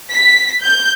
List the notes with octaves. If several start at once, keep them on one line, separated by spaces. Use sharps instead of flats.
B6
G6